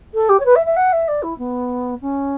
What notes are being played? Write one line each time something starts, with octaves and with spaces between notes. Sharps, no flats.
A4
G4
C#5
B4
E5
E5
F#5
E5
D5
E4
B3
C#4